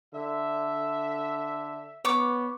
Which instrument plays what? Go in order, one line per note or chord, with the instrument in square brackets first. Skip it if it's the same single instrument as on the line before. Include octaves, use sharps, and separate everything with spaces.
[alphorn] D3 [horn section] E5
[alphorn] B3 [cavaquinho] C#5 D6